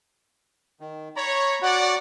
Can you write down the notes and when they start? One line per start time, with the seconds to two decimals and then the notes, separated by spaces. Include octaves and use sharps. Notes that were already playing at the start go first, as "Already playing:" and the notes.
0.80 D#3
1.16 C#5 A#5 B5
1.62 F#4 D5 F#5